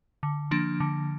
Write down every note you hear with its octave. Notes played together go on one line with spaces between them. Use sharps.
D3
F3 A#3 D4
D3